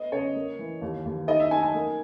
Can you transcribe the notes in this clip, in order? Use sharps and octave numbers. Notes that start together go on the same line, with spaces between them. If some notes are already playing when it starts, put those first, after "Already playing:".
Already playing: B3 D#5
C#3 C#5
A#3
E3
D#2
D#2
D#4 D#5
E5
D#4 G#5
G#5
A#3